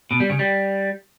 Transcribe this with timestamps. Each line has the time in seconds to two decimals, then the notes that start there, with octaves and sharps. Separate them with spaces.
0.11 B2
0.20 G3
0.30 C#3
0.39 G3